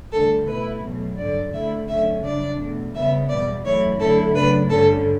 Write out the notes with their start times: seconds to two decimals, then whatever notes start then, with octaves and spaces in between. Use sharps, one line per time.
0.12 D2 D3 G3 A4
0.48 B2 A3 E4 B4
0.83 E2 B2 F#3 A3
1.18 G2 D3 F#3 D5
1.53 D3 A3 E4 E5
1.88 F#2 D3 A3 C#4 E5
2.23 C#3 G3 D4 D5
2.58 E2 B2 A3
2.93 C#3 G3 B3 E5
3.29 E2 B2 G3 D5
3.64 F#2 E3 A3 E4 C#5
3.99 F#2 D3 A3 E4 A4
4.34 F#2 C#3 F#3 A3 D4 B4
4.69 G2 D3 G3 C#4 A4